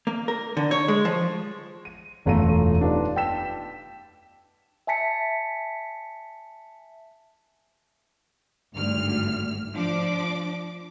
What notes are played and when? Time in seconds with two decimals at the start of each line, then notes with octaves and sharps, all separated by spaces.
0.07 A#3
0.28 A#4
0.57 D3
0.71 C#5
0.88 G#3
1.05 F3
1.85 D#7
2.25 E1 F#2 A3 F4 A#5 D#7
2.81 B3 D4 D#4 F4 G4
3.16 G5 A5 E6 B6 E7
4.87 E5 G#5 A5 B6 C#7
8.74 G#1 D2 G2 F6
9.75 F3 D4 D6